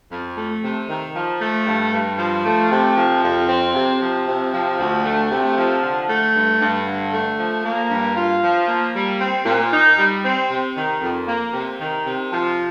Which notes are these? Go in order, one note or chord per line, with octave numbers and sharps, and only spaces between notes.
F2
A3
C3
D#3
F3
A3
G2
G2
F3
A3
C3
F3
F2
C4
C3
F3
C3
F3
D2
A3
C3
F3
D3
A3
G2
G2
D3
A3
F3
A#3
G2
F4
F3
A#3
G3
C4
A#2
D#4
G3
C4
C3
D#3
F2
A#3
C3
D#3
C3
F3